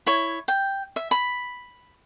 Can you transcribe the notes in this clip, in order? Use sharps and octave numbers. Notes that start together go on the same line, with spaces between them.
E4 C#5
G5
E5
B5